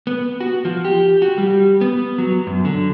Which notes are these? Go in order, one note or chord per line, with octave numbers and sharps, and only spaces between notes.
B3
F#4
F3
G4
F#4
G3
B3
F#3
F#2
D3